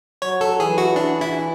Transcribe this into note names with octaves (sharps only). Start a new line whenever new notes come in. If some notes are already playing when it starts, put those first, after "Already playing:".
F#3 C#5
A4
E3 G#4
F#4
D4
E4